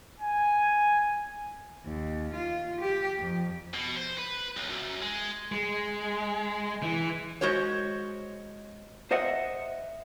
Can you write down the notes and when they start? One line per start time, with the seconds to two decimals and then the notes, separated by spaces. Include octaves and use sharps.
0.20 G#5
1.85 D#2
2.33 F4
2.81 G4
3.19 F2
3.73 B2
3.96 C5
4.18 B4
4.57 B1
4.69 F#2
5.02 G#3
5.52 G#3
6.83 E3
7.41 G#3 F#4 C5 C#5
9.11 C5 D#5 E5 F#5